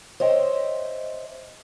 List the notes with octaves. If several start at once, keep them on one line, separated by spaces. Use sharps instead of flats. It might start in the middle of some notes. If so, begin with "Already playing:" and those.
C5 C#5 D#5 E5 G5